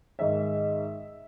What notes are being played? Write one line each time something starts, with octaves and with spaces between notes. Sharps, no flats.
G#2 D#3 G#3 E5